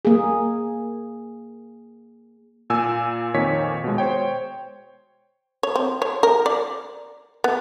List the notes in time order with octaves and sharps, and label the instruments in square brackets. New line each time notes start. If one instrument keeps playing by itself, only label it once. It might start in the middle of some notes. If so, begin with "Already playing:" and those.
[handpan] A#3 G#4
[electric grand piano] A#2 G#5 E6
F2 A#2 D#3 C#5 G#5 B6
B2 G#3
C5 C#5 G5
[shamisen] C#5
C4
C#5
A#4
D5
B3